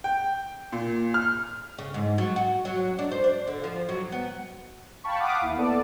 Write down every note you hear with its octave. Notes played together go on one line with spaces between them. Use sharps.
G5
A#2
F6
C#3
G#2
F#3
F#4
F#3
D4
C5
D4
D3
F3
F#3
B3
F5 G5 A5 B5 C#6
F5 F#5 B5 D6 D#6
D#2 E4
B3 A4 D5 A5